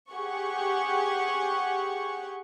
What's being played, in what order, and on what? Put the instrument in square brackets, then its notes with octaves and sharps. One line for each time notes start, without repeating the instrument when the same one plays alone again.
[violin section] G4 G#4 F#5 C#6